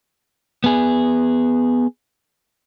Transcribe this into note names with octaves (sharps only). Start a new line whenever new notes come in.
B3 G#4